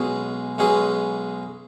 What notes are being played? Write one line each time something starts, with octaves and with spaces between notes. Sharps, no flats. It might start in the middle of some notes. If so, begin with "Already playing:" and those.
Already playing: B1 B2 G#3 C#4 G#4
B1 B2 G#3 C#4 G#4